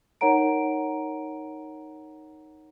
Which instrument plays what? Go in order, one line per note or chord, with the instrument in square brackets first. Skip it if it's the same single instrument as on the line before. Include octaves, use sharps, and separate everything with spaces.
[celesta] D#4 A#4 C#5 F#5 A#5 D7